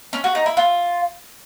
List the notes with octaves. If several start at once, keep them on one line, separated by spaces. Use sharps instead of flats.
C#4
F#4
D#4
E4
F4